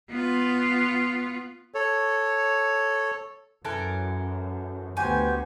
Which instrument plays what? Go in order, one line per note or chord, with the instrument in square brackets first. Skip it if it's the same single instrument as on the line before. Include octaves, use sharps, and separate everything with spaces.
[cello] B3 F4
[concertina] A4 C#5
[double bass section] F#2 [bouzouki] E3 A4 A#4
[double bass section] D2 B3 [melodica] F#4 G4 C5 [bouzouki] G#5